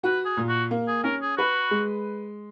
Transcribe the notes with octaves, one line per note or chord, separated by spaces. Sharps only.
F#4 B4
G#4
A#2
F#4
A#3
G#4
C#4 A#4
G#4
F#4 B4
G#3